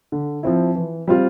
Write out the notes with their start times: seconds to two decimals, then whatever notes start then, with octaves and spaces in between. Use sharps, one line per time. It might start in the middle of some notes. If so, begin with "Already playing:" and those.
0.12 D3
0.43 F3 C4 E4
0.75 E3
1.08 G3 C4 F4